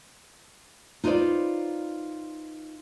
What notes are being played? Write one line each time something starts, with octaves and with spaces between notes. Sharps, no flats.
D#4 F4 B4 C5 D5